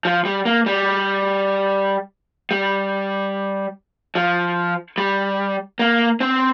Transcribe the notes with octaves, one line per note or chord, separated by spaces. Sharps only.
F3
G3
A#3
G3
G3
F3
G3
A#3
C4